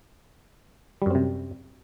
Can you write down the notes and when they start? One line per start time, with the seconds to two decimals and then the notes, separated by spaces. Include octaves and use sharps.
1.02 G3
1.06 F#2
1.11 C4
1.15 C3